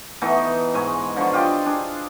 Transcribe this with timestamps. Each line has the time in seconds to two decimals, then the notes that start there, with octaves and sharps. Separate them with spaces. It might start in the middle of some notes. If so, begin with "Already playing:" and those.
0.22 E3 A3 B3 D#4
0.74 G#2 G#3 G#5 C#6
1.17 D3 F3 C5 C#6
1.33 F4 G4 D#5 G5
1.66 D4 G#4